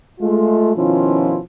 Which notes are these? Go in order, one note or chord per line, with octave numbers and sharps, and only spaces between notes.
G#3 A3 F4
B2 D#3 F3 C#4 E4 F4